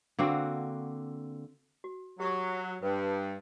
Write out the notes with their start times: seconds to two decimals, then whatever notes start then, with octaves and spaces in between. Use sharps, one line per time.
0.18 D3 A#3 C4 F#4
1.84 F#4
2.20 F#3 G4 C#6 D#6
2.82 G2 B4